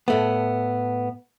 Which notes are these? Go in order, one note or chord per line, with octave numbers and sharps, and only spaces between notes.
A2 A3 B3